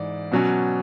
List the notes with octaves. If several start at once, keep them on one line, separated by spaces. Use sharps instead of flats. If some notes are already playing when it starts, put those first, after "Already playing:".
Already playing: G#2 E3 D5
B2 F#3 C#4